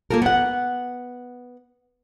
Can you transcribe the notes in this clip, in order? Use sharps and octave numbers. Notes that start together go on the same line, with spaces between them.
A#3 C#4 F4 A4 A#4
B3 F#5